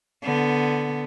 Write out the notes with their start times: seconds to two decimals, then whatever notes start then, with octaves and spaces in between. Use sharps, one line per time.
0.23 D3 B3